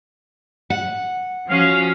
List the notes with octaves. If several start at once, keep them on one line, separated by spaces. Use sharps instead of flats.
F#5
F3 C#4 F#4 F5